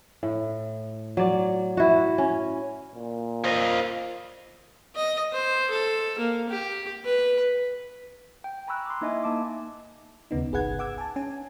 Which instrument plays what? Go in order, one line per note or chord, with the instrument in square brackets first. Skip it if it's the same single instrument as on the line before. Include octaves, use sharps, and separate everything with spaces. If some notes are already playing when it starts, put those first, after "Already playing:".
[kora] A2
F#3 D5
E4 F#4
C#4
[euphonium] A#2
[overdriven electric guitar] F4 D#5 [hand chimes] A#4 C5
[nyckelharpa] D#5
C5
A4
A#3
G4
B4
[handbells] G5
G#5 A#5 B5 C#6 E6 F#6
C6 D6
A#3 D#4 E4 D#5 E5 G#5
A#3 A5 D6
[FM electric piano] D#2 C#3 B3 D#4
G1 C2 G#4 B4 F#5 G#6
F#5 D6 E6 G#6
G#5 A5
C#4 G#5